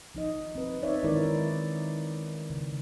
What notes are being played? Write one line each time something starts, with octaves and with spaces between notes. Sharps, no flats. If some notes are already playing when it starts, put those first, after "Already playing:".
F3 D#4 D#5
C4 B4
C#4 D#4 C#5 D5 E5
D#3 G#3 D#4 E4 A#4 D5
C#3